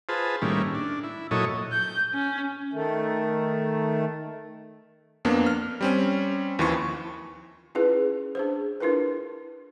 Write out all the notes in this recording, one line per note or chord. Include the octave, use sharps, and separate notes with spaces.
F4 G#4 B4 C5 A5
A2 D#3 G3 A#3 C#4 E4
D4
E4
A#2 F#3 E4 A4 C#5 D#5
G6
C#4
D#3 A3
F2 A#3 B3 D4
F6
G3 C4 C#4
D#2 E3 F3 E4 C6 C#6
C#4 E4 F4 G#4 B4
D4 G#4 C5
D4 E4 F4 A#4 B4